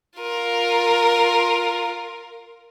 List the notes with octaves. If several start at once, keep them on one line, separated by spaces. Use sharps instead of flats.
F4 A#4